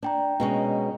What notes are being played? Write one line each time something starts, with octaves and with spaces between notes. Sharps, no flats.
D4 D5 G5 A#5
B2 G#3 C#4